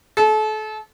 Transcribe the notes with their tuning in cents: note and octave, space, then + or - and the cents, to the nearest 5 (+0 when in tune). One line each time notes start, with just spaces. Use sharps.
A4 -35